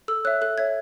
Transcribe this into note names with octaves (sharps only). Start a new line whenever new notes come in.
A4 E6
C#5 E5 F#6
A4 F#6
C#5 E5 G#6